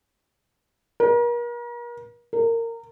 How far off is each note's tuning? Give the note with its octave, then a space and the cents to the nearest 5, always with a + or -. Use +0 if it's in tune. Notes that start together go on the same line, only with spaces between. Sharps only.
A#4 +40
A#4 -20